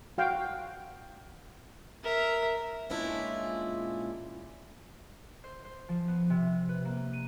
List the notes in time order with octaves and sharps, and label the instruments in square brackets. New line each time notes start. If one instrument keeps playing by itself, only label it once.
[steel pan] F#4 F5 G5
[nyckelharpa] A#4 E5
[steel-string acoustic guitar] A#2 G#3 C#4 D4 E4 F4
[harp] C5
C5
F3
B3
C3
B4
A#3
D#7